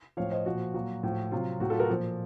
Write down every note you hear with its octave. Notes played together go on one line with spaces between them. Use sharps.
A2 F3 C#5 F5
C5 D#5
A#2 F3 F#4
A#2 F#3 F#4
A2 F3
C3 F#3 F4
A2 F#3 F#4
F4 A4
F#4 A#4
A#2 F3